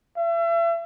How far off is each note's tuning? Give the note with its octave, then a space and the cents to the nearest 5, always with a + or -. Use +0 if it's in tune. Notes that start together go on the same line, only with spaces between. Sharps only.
E5 +35